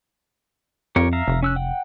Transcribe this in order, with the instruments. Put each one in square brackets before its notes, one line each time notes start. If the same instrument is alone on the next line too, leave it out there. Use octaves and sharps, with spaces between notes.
[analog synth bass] F2 [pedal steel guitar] G4 A#4 C#5
[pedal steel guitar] E5 F5 A#5
[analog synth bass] F1
[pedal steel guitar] C#4 E6 F#6
F#5 G5